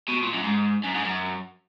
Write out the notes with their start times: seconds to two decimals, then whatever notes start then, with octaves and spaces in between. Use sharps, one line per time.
0.08 B2
0.23 A#2
0.33 F#2
0.44 G#2
0.84 F#2
0.95 G#2
1.05 F#2